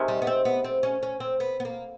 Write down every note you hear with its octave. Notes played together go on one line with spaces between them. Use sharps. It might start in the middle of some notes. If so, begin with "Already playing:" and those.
Already playing: C3 D#3 G#3
G3
B3
C4
B3
C4
C#4
C#4
C4
B3
B3
A#3